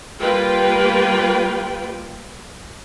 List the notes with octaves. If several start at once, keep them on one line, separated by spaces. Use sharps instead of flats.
G3 A#3 F4 G4 B4 G5